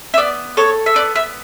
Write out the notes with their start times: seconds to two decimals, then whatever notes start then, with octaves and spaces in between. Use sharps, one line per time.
0.14 E5
0.18 B3 D5
0.57 A4 C#5
0.86 E5
0.96 B3 D5
1.16 E5